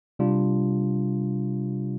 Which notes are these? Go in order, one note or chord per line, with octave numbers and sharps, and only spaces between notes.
C3 G3 D4 F4